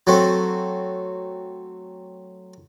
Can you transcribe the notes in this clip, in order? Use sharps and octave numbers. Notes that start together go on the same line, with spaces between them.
F#3 A3 C4